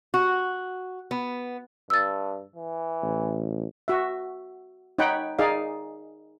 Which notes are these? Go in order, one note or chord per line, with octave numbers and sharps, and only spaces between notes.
F#4
B3
G2 E6 A6
E3
A1
F#4 E5
D#4 C#5 F#5 G5 B5
D#4 G#4 D5 F5